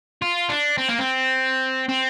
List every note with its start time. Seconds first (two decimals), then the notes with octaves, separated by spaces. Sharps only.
0.22 F4
0.49 D4
0.78 C4
0.89 A#3
0.99 C4
1.89 C4